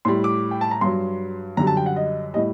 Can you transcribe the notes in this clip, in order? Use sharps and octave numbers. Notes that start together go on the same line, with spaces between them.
A2 G3 C6
D6
G5
A5
A#5
G2 F#3 C6
F#2 D3 G3 A#5
A5
G5
F#5
D#5
A2 G3 D#5